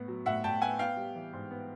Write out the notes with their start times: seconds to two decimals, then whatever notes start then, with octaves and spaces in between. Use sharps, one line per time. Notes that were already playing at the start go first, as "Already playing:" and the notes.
Already playing: A2 B3
0.08 F#3
0.26 A2 E5 F#5
0.44 A2 G5 A5
0.61 B3 F#5 G#5
0.79 B3 F5 G5
0.97 G3
1.15 E3
1.33 G#2
1.51 B3